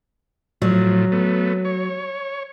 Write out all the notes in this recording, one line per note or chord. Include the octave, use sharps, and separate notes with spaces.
A2 F3 F#3
A3 B3
C#5